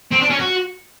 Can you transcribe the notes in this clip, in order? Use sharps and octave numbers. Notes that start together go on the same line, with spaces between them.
C4
D4
C#4
F#4